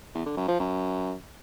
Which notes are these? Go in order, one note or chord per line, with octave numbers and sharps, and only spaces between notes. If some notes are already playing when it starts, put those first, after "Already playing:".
E2
D3
F#2
F3
F#2